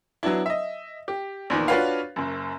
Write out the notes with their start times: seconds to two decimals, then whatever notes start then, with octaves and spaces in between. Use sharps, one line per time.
0.23 F#3 B3 D4 E4
0.46 D#5 E5
1.08 G4
1.50 A#1 E2 D#3
1.68 D4 F4 F#4 B4 C#5 F5
2.16 F#1 F#2